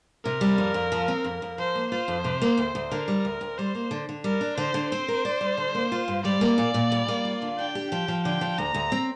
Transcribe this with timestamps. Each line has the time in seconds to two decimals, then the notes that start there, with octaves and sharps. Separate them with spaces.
0.24 C3 A#4
0.41 G3
0.58 F2
0.74 F2
0.92 F3
1.08 C4
1.24 F2
1.42 F2
1.58 F3 C5
1.75 A#3
1.91 F4 C5
2.08 F2
2.24 C3
2.42 A#3
2.58 D2
2.75 D2
2.91 D3 A#4
3.08 G3
3.25 D2
3.41 D2
3.58 G3 C5
3.75 A#3
3.91 D3
4.09 D3
4.24 G3 A#4
4.41 D4
4.57 D3 C5
4.74 D3
4.91 C4 C5
5.08 A#4
5.25 D5
5.41 G3
5.57 D3
5.75 A#3
5.92 F4
6.08 G2
6.24 G3 D5
6.41 A#3
6.58 A#2
6.74 A#2
6.92 G3
7.08 A#3
7.25 F4
7.42 D3
7.58 D4 G5
7.75 G4
7.91 F3 G5
8.08 F3
8.25 D3 G5
8.41 F3
8.58 D2 A#5
8.74 D2
8.92 C4